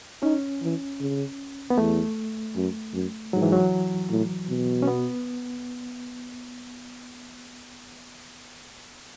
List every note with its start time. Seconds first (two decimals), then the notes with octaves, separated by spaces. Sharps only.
0.22 C#4 D#4
0.62 E3
1.00 C#3
1.70 B3
1.78 E2 A3
2.55 F#2
2.93 F#2
3.33 G#2 F#3
3.42 E3
3.52 F#3
4.10 A2
4.49 B2
4.82 C#4
4.88 B3